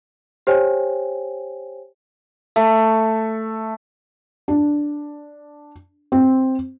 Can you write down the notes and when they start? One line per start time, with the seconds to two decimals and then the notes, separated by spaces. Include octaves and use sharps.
0.47 G4 C5 C#5 G5 G#5
2.56 A3
4.48 D4
6.12 C4